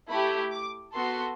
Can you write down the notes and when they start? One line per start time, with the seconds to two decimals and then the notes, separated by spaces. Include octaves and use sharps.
0.10 A3 E4 G4 B5
0.52 D6
0.93 B3 F#4 A4 C6